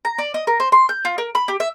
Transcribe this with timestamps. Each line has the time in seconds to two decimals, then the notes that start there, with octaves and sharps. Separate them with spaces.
0.05 A#5
0.18 D5
0.34 D#5
0.47 A#4
0.60 C5
0.72 C6
0.89 G6
1.05 F4
1.18 A#4
1.35 B5
1.48 G4
1.60 E5